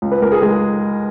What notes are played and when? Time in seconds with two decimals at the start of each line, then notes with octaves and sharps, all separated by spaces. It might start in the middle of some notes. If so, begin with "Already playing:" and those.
0.02 C#2
0.12 B4
0.22 C#2 A#4
0.32 G#4
0.42 G#3 G#4